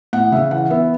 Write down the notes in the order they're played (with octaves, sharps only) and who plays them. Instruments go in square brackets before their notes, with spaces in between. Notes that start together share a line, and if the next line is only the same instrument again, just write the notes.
[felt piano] A2 F#5
C#3 E5
E3 F#5
B3 E5